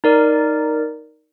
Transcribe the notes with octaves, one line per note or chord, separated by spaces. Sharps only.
D#4 A#4 D5